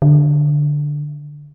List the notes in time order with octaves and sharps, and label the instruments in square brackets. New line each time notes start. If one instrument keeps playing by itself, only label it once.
[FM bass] D3